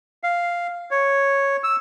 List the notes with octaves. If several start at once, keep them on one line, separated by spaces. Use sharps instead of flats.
F5
C#5
E6